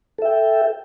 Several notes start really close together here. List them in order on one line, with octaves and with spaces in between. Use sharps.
A4 E5 G5